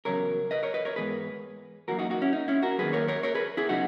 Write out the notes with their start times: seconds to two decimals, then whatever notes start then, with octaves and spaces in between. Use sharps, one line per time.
0.05 E2 C#3 F#3 A#4 C#5
0.51 B4 D#5
0.63 A#4 C#5
0.74 B4 D#5
0.85 A#4 C#5
0.96 G#2 E3 B3 G#4 B4
1.88 F#2 E3 A#3 F#4 A#4
1.99 D#4 F#4
2.10 D#4 F#4
2.22 C#4 E4
2.33 D#4
2.48 C#4 E4
2.62 F#4 A#4
2.78 F#2 D#3 A#3 G#4 B4
2.93 A#4 C#5
3.08 A#4 C#5
3.23 A#4 C#5
3.35 G#4 B4
3.57 E4 G#4
3.69 C#3 F#3 B3 D#4 F#4